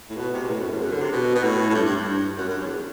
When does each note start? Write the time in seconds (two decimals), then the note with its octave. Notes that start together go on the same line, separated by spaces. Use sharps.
0.10 A2
0.17 B2
0.34 C3
0.43 B2
0.49 A2
0.59 F#2
0.70 E2
0.81 F#2
0.91 D3
1.01 C3
1.12 B2
1.35 B2
1.44 A2
1.69 A2
1.74 G2
1.85 G2
1.97 G2
2.37 F#2
2.49 F#2
2.59 G2
2.64 E2